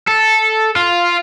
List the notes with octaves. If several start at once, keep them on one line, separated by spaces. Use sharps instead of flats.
A4
F4